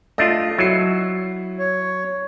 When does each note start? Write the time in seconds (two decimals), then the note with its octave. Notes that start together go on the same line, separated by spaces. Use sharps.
0.18 A3 D4 F4 D#5
0.58 F#3 E4 C7
1.59 C#5